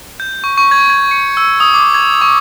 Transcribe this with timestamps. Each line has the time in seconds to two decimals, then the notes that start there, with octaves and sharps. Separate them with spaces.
0.20 G6
0.44 C#6
0.57 C#6
0.71 G#6
0.90 G#6
1.11 C#7
1.37 E6
1.60 D#6
1.74 D6
1.94 G#6
2.22 C#6